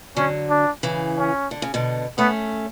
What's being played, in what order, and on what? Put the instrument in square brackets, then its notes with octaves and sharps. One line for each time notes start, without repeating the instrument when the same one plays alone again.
[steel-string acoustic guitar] D3 F#3 [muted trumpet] C#4
[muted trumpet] D4
[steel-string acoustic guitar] C#3 E3
[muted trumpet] C#4
[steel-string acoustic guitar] D3
C#3
B2 D3
[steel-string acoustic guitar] A3 C#4 [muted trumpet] B3